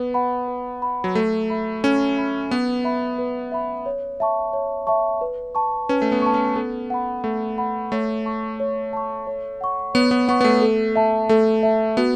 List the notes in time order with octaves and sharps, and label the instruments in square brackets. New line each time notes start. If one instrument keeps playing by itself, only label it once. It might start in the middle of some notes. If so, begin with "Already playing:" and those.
Already playing: [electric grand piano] B3 [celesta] B4
[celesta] F#5 B5
B4
F#5 B5
[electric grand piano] F#3
[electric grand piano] A3 [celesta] A4
[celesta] E5 B5
[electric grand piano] C#4 [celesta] A4
[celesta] E5 B5
[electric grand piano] B3 [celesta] B4
[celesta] E5 B5
B4
E5 B5
C#5
E5 A5 C#6
C#5
E5 A5 C#6
B4
A5 C#6
[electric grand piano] C#4 [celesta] B4
[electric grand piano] A3
B3
[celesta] A5 C#6
[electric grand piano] C#4
[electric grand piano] B3 [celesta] A4
[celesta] F#5 B5
[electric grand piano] A3 [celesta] A4
[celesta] F#5 B5
[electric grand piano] A3 [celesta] C#5
[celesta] A5 C#6
C#5
A5 C#6
C#5
F#5 C#6
[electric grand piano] B3 [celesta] C#5
[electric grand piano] B3
[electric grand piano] B3 [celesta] F#5 C#6
[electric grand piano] B3
A3
[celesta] A4
E5 A5
[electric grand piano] A3 [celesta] A4
[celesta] E5 A5
[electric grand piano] B3 [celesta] F#4